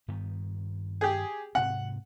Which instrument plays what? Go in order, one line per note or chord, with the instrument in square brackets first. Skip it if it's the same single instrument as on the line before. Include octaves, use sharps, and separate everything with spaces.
[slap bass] G2 D#3 B3
[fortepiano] G4 G#4
[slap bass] G#2 C3 C4 [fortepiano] F#5